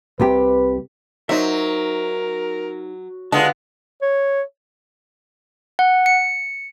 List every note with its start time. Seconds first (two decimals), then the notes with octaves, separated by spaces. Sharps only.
0.20 C2 C3 G4 B4
1.29 F#3 D#4 A#4 C5 E5
3.32 D3 G#3 B3 D4 F4 A5
4.02 C#5
5.79 F#5
6.06 C#7